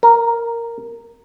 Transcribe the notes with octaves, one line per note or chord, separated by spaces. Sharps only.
A#4